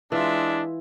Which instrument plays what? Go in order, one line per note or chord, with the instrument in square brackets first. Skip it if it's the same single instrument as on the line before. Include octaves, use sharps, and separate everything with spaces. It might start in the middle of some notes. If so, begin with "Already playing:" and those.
[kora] E3 F4 [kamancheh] G#3 E5 [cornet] D4